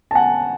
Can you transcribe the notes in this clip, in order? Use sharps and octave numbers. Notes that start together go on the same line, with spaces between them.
A5
F#5 G#5